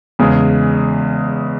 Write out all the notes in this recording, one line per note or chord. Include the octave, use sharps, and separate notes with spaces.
E2 C#3 G#3